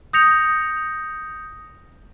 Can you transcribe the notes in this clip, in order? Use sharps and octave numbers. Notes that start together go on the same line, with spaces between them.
D#6 G6 A#6 C#7 F7